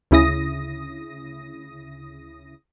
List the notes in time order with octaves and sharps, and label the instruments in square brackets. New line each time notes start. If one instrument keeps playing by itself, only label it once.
[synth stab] D2 C#3 E4 D#6 A#6